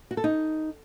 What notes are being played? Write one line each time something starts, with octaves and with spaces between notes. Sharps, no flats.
F#4
A4
D#4